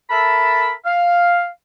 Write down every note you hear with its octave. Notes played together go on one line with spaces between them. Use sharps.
A4 A#4 E5 A5 B5
F5